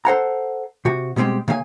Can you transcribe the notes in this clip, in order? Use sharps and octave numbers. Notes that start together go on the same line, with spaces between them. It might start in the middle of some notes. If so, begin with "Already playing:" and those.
A4 C5 F#5 A#5
C3 F#4
B2 G3 G#3 C4 G4
C#3 A#3 E5 G#5